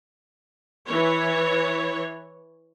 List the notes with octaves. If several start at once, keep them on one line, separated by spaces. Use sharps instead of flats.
E3 C#5